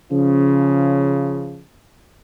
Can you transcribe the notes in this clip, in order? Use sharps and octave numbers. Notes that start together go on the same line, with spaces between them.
C#3 F3